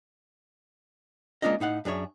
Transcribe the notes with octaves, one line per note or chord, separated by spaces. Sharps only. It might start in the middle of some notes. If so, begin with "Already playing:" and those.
G#3 A#3 C#4 D4 F4 D#5
A2 D#4 F5 F#5
F#2 D4 G#4 C#5 E5